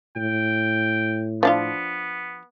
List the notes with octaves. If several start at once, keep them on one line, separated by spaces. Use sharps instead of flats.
A2 G5
F3 B3 D4 F4